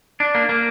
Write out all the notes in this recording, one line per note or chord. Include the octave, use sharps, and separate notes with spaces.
D4
A#3
A#3